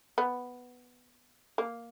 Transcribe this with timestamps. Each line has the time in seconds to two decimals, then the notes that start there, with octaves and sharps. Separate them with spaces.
0.18 B3
1.58 A#3